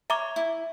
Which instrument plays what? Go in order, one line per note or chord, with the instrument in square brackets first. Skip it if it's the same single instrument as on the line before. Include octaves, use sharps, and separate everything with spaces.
[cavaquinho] C#5 [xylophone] E5 A#5 D6
[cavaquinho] E4